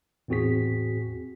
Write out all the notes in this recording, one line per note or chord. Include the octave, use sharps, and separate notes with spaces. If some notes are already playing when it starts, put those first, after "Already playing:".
E2 A2 C4 F#4 G#4 B6